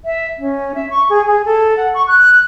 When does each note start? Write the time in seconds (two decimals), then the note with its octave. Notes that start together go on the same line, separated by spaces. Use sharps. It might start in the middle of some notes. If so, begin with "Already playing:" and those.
0.05 E5
0.39 C#4
0.75 E5
0.90 C#6
1.10 G#4
1.27 G#4
1.45 A4
1.77 F#5
1.94 C#6
2.07 F#6